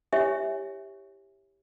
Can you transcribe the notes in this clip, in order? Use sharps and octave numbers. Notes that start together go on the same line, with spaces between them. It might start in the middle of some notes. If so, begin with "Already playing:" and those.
E4 G4 C#5 E5 G#5